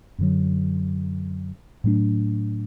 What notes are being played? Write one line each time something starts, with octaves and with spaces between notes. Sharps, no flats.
F#2 D3 F#3
A2 F#3 A3 D4